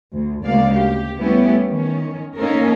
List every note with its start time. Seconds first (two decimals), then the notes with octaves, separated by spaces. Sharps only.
0.13 D2
0.43 D2 C#3 G#3 A#3 D5 F5
0.74 G4
1.19 G3 A3 B3 C#4 E4 G4
1.67 D#3 C#4
2.35 A#3 C#4 D#4 A4 A#4